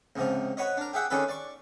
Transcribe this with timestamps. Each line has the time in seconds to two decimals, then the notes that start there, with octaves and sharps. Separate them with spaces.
0.16 C#2 G#2 C3 F3
0.57 F#4 B4 C#5 D#5
0.77 D4 A#4
0.93 G4 G#4 E5 F#5 G5
1.10 D#3 C#4 D4 G#4 A4 B4
1.29 D5 C#6